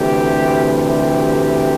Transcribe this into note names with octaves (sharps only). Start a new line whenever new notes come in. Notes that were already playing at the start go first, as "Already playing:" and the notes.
Already playing: D2 C3 E3 G4
G4